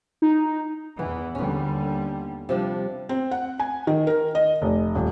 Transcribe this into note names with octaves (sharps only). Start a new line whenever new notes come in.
D#4
E2 E3 B3
D#2 D3 G3 C#4 B4
C3 F3 G3 D4
C4
F#5
G#5
D#3
A#4
D#5
F1
D#1